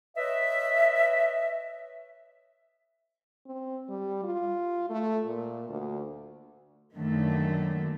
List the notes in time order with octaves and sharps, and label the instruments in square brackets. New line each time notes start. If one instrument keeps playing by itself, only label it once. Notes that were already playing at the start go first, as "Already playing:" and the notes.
[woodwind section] B4 C#5 D#5 E5
[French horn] C4
G3
F4
A3
A#2
D2
[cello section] F#2 D3 D#3 F#3 A3 A#3